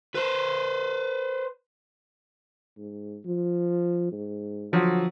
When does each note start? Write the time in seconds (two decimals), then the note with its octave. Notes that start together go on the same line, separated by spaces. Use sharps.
0.15 B4 C5
2.77 G#2
3.25 F3
4.12 G#2
4.72 D3 F3 F#3